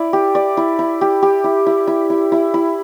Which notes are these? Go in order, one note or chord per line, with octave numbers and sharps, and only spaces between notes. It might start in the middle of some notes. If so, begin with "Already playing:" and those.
Already playing: E4 D5
G4
D5
E4
E4
G4
G4
E4
E4
E4
E4
E4
E4